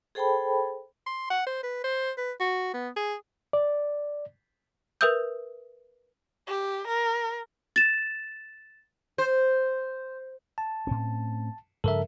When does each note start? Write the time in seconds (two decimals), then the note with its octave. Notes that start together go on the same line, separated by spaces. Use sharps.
0.15 G#4 A4 C5 G5 A5 B5
1.06 C6
1.30 F#5
1.47 C5
1.63 B4
1.84 C5
2.18 B4
2.40 F#4
2.74 B3
2.96 G#4
3.53 D5
5.01 A#4 B4 E5 D#6 E6 G6
6.47 G4
6.87 A#4
7.76 A6 E7
9.18 C5
10.58 A5
10.87 A2 C4 C#4
11.84 G2 C#3 F3 A4 A#4 E5